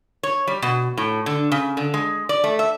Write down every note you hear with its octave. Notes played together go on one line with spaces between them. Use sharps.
C#5
G3
B2
A2
D3
C#3
D3
G#3
D5
A3
E5